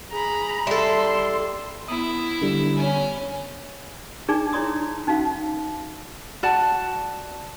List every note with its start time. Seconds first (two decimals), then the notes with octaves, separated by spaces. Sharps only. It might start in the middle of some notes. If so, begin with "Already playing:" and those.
0.13 G#4 A#5 B5
0.67 G3 E4 A4 C6
1.88 B3 E4 D#6
2.42 D3 G3
2.76 C#4 G#5
4.28 D4 D#4 G#4 D5
4.53 D4 E4 C#5 D5 C6 D#6
5.07 C#4 D#4 F#4 F5
6.43 F#4 D5 A5